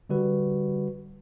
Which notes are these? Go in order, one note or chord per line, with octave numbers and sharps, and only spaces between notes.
D3 G3 F#4 B4